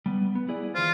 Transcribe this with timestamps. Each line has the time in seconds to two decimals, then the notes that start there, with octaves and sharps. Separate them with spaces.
0.06 G3 B3
0.35 B3
0.48 E4 G#4 D5
0.75 E3 F4 C5